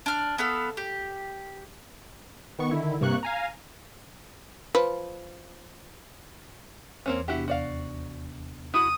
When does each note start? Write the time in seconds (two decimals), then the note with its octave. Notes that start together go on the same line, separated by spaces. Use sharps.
0.06 D4 F6
0.38 B3 A4 F5 E6
0.77 G4
2.59 D#3 B3 C#6
2.71 D3 D#3 E4
3.01 G2 C3 A#3 C#6 F#6
3.23 F5 G#5 A#5
4.75 F3 B4
7.06 E2 E3 A#3 C4 C#4
7.28 C3 B3 D4 E4 F#4 G4
7.48 D#2 F#4 D5 F5
8.74 E4 F#4 D#6